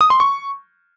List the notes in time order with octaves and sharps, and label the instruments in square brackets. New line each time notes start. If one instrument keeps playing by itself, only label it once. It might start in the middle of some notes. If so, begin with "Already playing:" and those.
[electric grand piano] D#6
C6
C#6